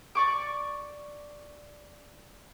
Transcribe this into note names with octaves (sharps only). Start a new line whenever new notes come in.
D5 C#6 D6